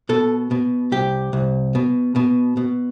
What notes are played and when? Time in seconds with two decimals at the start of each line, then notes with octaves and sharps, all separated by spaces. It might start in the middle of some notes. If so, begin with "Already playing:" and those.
0.09 B2 A4
0.51 B2
0.92 C2 G4
1.33 C2
1.75 B2
2.16 B2
2.57 B2